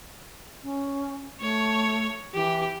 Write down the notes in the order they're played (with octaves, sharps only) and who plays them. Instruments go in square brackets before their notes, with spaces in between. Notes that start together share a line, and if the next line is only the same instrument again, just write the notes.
[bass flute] C#4
[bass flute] A3 [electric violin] C#5
[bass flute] E3 [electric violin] G4